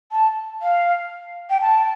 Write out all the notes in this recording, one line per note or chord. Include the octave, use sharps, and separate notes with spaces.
A5
F5
G5
A5